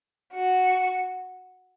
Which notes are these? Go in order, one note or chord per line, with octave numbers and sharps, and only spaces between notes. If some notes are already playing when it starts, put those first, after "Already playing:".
F#4